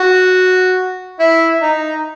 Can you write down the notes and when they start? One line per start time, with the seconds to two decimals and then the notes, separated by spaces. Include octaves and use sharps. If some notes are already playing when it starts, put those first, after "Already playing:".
Already playing: F#4
1.19 E4
1.62 D#4